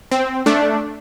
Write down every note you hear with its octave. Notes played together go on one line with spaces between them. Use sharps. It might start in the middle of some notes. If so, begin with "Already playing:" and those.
C4
A3 D4